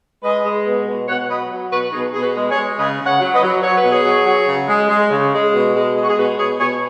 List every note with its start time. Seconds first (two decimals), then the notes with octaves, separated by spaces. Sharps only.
0.22 G#3 B4 D#5
0.44 G#3
0.65 B2
0.86 B2
1.07 B2 C#5 F#5
1.29 F#3 B4 D#5
1.50 F#3
1.71 B2 F#4 B4
1.92 B2 D#4 G#4
2.12 B2 G#4
2.21 F#4 B4
2.35 G#3
2.49 G#4 C#5
2.56 G#3
2.77 C#3 B4 D#5
2.99 C#3
3.06 C#5 F#5
3.19 F#3
3.33 B4 D#5
3.41 F#3
3.62 F#3 C#5
3.75 B4
3.83 B2
3.88 G#4 C#5
4.04 F#3
4.26 F#3
4.46 C#3
4.67 G#3
4.89 G#3
5.10 C#3
5.32 G#3
5.53 B2
5.74 G#3
5.94 G#3
6.01 F#4
6.08 G#4
6.16 B2 F#4 B4
6.37 B2 G#4 C#5
6.58 B2 G#4 C#5